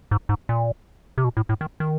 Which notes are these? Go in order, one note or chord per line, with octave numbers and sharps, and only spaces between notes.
G#2
G#2
A#2
C3
B2
A2
A2
D#3
D#3